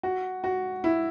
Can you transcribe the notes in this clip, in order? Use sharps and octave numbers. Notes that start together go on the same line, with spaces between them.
F#4
F#4
E4